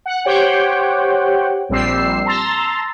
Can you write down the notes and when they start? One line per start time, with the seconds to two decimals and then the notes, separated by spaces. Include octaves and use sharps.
0.06 F#5
0.25 G4 C5 C#5 F#5 G5
1.69 A#1 G3 C4 E6 C7
2.26 A5 A#5 C6 E6 A6